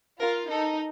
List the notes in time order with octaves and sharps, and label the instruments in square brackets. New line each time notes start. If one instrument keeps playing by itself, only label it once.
[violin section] F4 [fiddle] A#4
[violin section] D#4 [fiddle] A4